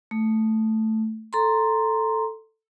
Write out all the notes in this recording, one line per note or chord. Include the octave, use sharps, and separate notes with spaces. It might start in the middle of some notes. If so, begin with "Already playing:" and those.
A3
A4 A#5 C6